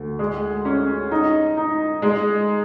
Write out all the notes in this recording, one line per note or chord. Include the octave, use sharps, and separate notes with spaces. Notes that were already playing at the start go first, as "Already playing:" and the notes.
Already playing: D2
G#3
C#4
D#4
D#4
G#3